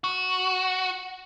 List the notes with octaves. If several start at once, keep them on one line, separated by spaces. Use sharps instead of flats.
F#4